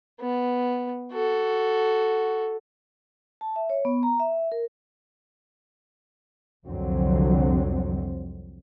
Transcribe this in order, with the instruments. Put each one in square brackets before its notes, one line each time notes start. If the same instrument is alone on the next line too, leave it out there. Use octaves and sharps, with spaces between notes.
[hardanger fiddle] B3
F#4 A4
[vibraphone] A5
E5
C#5
B3
A#5
E5
A#4
[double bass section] C2 F2 D3 F#3 C4